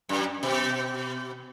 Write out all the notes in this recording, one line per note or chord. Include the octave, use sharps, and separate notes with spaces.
F#2
B2